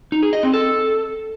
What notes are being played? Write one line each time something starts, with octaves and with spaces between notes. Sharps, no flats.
D#4
G#4
D#5
C4
A4